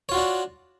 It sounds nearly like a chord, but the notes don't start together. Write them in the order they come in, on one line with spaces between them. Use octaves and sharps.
C#5 F4 F#4 D4